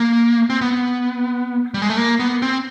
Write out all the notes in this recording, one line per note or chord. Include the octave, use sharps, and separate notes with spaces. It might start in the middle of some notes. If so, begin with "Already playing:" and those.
Already playing: A#3
C4
B3
G3
G#3
A3
A#3
B3
C4